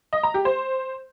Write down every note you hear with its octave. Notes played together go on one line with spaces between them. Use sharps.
D#5
A#5
G4
C5